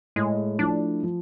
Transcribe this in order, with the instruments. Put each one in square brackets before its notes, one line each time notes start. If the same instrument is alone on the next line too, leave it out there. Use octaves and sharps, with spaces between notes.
[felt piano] A2 [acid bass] G#3
[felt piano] F3 A3 E4 [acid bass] D4
[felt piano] F3